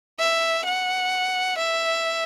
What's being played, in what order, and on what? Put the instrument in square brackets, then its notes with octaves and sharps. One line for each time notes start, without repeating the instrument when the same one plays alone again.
[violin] E5
F#5
E5